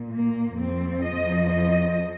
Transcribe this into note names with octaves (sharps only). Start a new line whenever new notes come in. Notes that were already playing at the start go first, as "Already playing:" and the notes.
Already playing: A#2
A#3
F2 F3 C4
D#5
D#5